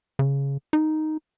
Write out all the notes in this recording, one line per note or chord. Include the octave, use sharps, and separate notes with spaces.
C#3
D#4